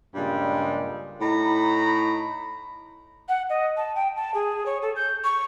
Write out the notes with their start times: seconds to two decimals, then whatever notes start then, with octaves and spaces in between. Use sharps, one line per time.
0.15 G2 A#2 C#3 G3 G#3
1.21 A2 D#4 A#5 B5
3.29 F#5
3.50 D#5
3.77 A5
3.96 G5
4.16 A5
4.34 G#4
4.66 C#5
4.82 A4
4.96 G6
5.24 C#6